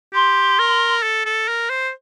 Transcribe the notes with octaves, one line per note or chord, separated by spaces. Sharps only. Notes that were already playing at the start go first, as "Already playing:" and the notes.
G4 C6
A#4
A4
A4
A#4
C5